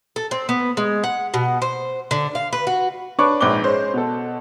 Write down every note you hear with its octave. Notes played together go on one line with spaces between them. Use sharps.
A4
C4
B3
G#3
F#5
B2
C5
D3
F5
B4
F#4
D4 B4 C#5 C#6 D6
A#1 G#2 B4 C5 D6 G7
G#3 C#4 C5
B2 A4